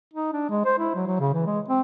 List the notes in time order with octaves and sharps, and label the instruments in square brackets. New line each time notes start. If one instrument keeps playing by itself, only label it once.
[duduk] D#4
D4
G#3
C5
E4
F#3
F#3
C#3
E3
G#3
C4